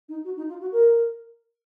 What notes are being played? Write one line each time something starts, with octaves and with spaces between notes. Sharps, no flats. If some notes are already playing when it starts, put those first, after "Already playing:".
D#4
F#4
D#4
F4
F#4
A#4